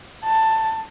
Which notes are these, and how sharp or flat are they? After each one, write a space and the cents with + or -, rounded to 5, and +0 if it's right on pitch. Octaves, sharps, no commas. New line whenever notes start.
A5 +15